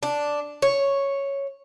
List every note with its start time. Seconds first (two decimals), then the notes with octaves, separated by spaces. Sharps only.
0.03 D4
0.62 C#5